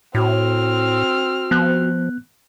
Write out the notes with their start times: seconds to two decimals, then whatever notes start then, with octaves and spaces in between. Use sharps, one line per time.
0.15 A2 C4 F#4 F6
1.51 F3 B3 F#6